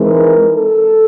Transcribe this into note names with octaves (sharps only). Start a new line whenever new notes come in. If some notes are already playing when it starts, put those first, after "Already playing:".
Already playing: E3 G#3 C4 D#4 A#4
A4